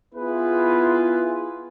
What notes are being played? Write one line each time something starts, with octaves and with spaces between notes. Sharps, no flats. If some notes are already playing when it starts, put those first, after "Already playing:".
B3 E4 F4 G#4 B4